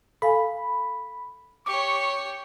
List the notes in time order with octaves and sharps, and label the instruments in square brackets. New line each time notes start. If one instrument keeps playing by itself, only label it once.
[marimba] A4 F5 G#5 [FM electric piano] B5
[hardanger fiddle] G4 C#5 [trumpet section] C#6 [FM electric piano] D6